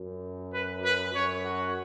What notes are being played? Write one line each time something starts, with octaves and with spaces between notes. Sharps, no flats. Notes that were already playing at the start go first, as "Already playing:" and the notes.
Already playing: F#2
B4
B4
F#2 C#5
F#4